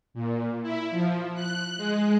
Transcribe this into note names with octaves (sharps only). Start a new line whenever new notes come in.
A#2
E4
F3
F#6
G#3